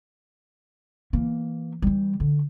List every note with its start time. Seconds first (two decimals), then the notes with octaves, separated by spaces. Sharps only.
1.13 E3 A#3
1.82 E3 G3
2.20 D3